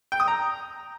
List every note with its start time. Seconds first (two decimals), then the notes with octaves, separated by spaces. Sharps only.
0.12 G5
0.20 D#6
0.28 A#5